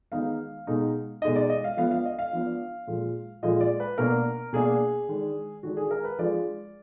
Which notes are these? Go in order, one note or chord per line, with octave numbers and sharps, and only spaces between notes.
D#3 G#3 B3 D#4 F5
B2 G#3 D#4
B2 G#3 D#4 D#5
D5
D#5
F5
F3 B3 D4 F5
F5
D#5
F5
F3 B3 D4
A#2 F3 G#3
A#2 F3 G#3 D#5
D5
B4
B2 A#3 D4 A#4
B2 A#3 D4 G#4
D#3 G#3 D4
D#3 G#3 D4 F#4
G#4
A#4
B4
F3 G#3 D4 D5